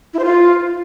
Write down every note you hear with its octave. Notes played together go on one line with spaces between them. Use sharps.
E4
C5
F4